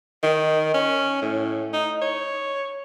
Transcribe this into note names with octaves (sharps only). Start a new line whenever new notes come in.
D#3
C#4
A2
D#4
C#5